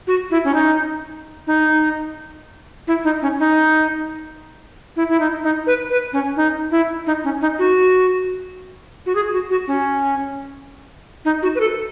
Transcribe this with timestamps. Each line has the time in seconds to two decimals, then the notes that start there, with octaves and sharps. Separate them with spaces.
0.07 F#4
0.31 E4
0.44 C#4
0.54 D#4
1.47 D#4
2.87 E4
3.04 D#4
3.22 C#4
3.39 D#4
4.96 E4
5.09 E4
5.20 D#4
5.43 D#4
5.67 B4
5.90 B4
6.13 C#4
6.37 D#4
6.71 E4
7.07 D#4
7.24 C#4
7.41 D#4
7.59 F#4
9.06 F#4
9.15 G#4
9.33 F#4
9.51 F#4
9.67 C#4
11.25 D#4
11.43 F#4
11.55 B4
11.60 A4